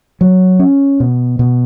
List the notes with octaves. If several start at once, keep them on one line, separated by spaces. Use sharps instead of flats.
F#3
C#4
B2
B2